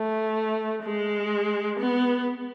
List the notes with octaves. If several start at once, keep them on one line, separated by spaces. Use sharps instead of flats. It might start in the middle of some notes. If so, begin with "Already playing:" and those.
Already playing: A3
G#3
B3